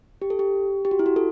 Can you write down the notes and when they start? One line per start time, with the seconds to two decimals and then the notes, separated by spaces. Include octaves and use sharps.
0.22 G4
0.30 A4
0.39 G4
0.85 G4
0.91 F#4
0.99 E4
1.06 F#4
1.16 A4